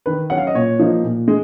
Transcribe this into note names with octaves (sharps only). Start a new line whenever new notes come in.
D#3 B4
F#3 C#4 F#5
F5
D#5
A#2 C#5
F3 A#3 D#4
A#2
G#3